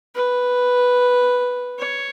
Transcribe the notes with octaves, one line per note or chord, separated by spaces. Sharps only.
B4
C#5